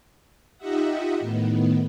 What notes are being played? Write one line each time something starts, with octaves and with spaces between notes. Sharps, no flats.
D#4 F4 G4 D#5 E5 F#5
A2 D#3 B3